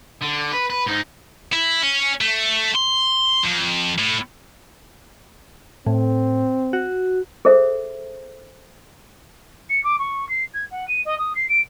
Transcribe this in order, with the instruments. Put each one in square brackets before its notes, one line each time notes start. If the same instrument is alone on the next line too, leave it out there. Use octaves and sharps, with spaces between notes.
[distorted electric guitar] D3
B4
B4
G#2 D#4
E4
C#4
A3
C6
F2
A2
[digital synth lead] A2 [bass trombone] C4
[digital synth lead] F#4
[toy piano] G#4 A4 C5 E5
[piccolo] C#7
D6
C#6
C7
G#6
F#5
D#7
D#5
D#6
C7
D7